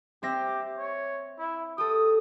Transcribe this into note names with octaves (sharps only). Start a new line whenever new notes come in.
C4 G4 E5 A#6
C#5
E4
G4 A4 D#6